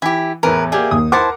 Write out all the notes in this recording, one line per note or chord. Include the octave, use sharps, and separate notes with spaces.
E3 E4 G4
E2 A2 A#4 B4
A#3 G4 G#4 D5 E5
D#2 D#6
E4 A#4 C5 F#5 A5 D6